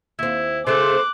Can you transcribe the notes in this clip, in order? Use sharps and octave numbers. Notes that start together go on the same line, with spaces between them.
D#2 C4 E4
C#3 A3 G#4 A4 C5 D6 F#6